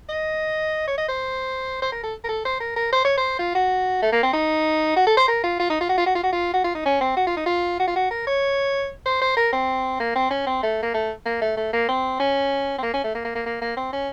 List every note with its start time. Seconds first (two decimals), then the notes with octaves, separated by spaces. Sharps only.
0.09 D#5
0.88 C#5
0.98 D#5
1.09 C5
1.82 C5
1.92 A#4
2.03 A4
2.24 A#4
2.29 A4
2.45 C5
2.61 A#4
2.76 A#4
2.93 C5
3.05 C#5
3.17 C5
3.39 F4
3.55 F#4
4.02 A3
4.13 A#3
4.23 C4
4.33 D#4
4.96 F#4
5.07 A4
5.17 C5
5.28 A#4
5.44 F4
5.60 F4
5.70 D#4
5.81 F4
5.89 F#4
5.98 F4
6.06 F#4
6.16 F4
6.23 F#4
6.33 F4
6.54 F#4
6.64 F4
6.75 D#4
6.86 C#4
7.01 C4
7.17 F#4
7.27 F4
7.37 D#4
7.46 F4
7.80 F#4
7.88 F4
7.96 F#4
8.11 A#4
8.27 C#5
9.06 C5
9.22 C5
9.37 A#4
9.53 C4
10.00 A#3
10.16 C4
10.31 C#4
10.47 C4
10.63 A3
10.83 A#3
10.94 A3
11.26 A#3
11.42 A3
11.57 A3
11.73 A#3
11.89 C4
12.20 C#4
12.79 C4
12.83 A#3
12.94 C#4
13.04 A3
13.15 A#3
13.25 A#3
13.35 A#3
13.46 A#3
13.62 A#3
13.77 C4
13.93 C#4